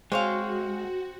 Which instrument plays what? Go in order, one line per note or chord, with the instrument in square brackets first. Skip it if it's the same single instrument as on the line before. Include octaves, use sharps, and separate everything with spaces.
[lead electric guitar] G#3 [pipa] C4 [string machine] F#4 [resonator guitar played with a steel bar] G#4 C#5 F5